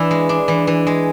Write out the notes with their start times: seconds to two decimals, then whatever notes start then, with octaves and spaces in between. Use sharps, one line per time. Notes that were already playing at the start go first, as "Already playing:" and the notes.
Already playing: E3 D4 E4
0.11 G#3
0.29 D4
0.48 E3
0.67 E3
0.87 G#3